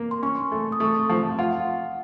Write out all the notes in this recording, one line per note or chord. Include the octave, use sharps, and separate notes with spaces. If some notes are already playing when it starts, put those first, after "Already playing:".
Already playing: A#3
C6
C#4 C#6
A3
D#6
A3 C#6
F3 A5
F4 F#5